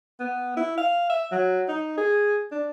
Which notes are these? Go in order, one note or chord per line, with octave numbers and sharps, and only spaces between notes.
B3
E4
F5
E5
F#3
D#4
G#4
D4